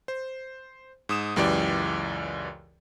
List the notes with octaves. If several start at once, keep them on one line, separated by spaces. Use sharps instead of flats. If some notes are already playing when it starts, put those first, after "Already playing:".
C5
G#2 D#6 E7
C#2 F#2 E3 G4 D5 D6